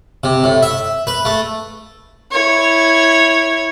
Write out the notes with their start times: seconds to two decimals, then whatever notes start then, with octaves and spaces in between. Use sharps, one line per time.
0.24 C3
0.44 A2
0.63 E5
1.07 B4
1.25 A3
2.32 E4 C#5